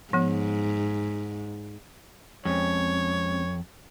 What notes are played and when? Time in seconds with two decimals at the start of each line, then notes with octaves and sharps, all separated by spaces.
0.13 G#2 F3 B3
2.45 F2 G#3 C4 C#4 C#5